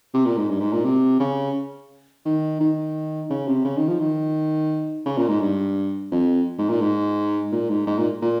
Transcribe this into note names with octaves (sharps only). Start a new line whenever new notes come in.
C3
A#2
G#2
G2
G#2
A#2
C3
C#3
D#3
D#3
C#3
C3
C#3
D#3
F3
D#3
C#3
A#2
G#2
G2
F2
G#2
A#2
G#2
A#2
G#2
G#2
A#2
A#2